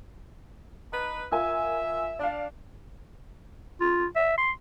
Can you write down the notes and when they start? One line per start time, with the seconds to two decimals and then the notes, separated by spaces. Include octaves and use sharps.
0.92 D#4 B4
1.32 F4 A#4 E5 G#5
2.19 D4 D5 F5
3.80 F4
4.16 E5
4.38 C6